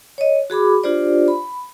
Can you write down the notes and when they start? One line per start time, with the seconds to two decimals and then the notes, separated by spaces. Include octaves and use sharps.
0.18 C#5 D#5
0.50 F#4 G#4 B5 D6
0.84 D4 F4 G4 C5 D5
1.28 B5